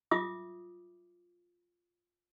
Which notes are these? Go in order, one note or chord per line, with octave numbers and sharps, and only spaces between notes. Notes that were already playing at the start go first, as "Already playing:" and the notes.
F4 E5 D6 D#6